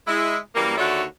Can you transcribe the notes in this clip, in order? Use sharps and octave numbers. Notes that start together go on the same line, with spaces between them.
G#3 E4
F#2 E3 G3 A#3
D#2 D3 F#4 C#5 D5 E5